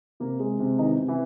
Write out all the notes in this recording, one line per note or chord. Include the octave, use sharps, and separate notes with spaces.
C3 A#3
G#3
C3
D#3 E3 D#4
C3
E3 E4